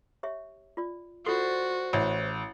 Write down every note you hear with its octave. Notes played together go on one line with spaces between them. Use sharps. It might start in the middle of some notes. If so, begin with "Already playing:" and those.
G4 C#5 E5
F4 D5
F4 F#4 A4 C5 D5 C6
A1 E5